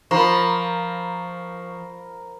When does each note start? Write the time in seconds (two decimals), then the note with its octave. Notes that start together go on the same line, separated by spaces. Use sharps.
0.11 F3 A#4 B5 C#6